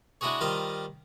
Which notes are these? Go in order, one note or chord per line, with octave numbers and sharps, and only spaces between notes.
G#3 D4 E4 F#4 G#4 C#5
D#3 G3 F4 C5 D#5 A#5